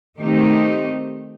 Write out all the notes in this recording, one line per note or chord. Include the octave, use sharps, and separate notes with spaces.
D#3 A3 C4 D#4 G4